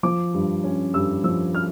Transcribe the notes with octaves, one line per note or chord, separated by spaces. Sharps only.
F3 D6
G2
C#4
G2 E6
F3 E6
F6